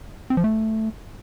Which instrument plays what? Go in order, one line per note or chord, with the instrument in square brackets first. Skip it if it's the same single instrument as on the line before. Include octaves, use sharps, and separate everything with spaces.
[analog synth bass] C4
F3
A3